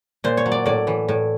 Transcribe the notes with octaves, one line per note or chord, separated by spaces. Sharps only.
A#2 C5
C#5
F#3
D5
A2 D5
E3
A2